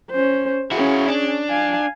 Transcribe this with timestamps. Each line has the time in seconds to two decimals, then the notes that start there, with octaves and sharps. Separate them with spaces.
0.11 C#4 C5
0.72 C#4 E4 F#4 G#4
1.08 D4
1.50 F5 G#5